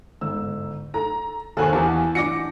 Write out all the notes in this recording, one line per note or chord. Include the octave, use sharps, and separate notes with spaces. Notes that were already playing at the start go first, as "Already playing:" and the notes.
G1 G#2 E6
A4 A#5
D#2 F#4 A4 A#4 C5 F5 G#5 C#6
E2 E3 G4 A5
D4 F#4 D6 A#6 C#7